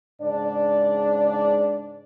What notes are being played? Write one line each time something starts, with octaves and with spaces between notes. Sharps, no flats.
G#2 C#3 D4 D5